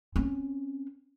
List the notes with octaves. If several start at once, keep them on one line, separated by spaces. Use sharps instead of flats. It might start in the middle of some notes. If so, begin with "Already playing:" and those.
C4 C#4